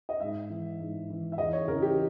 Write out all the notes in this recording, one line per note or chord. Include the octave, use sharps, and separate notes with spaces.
D#5
G#2 E5
E3
G#2
E3
E5
E2 D#5
C#5
C#3 E3 A#4
G4